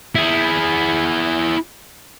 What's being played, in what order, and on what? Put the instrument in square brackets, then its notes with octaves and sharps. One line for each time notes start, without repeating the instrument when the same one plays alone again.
[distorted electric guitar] E4 G#4